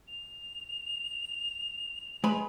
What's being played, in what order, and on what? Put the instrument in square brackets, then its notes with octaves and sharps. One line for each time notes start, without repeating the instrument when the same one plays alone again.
[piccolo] F7
[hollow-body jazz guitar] G#3 B4 B5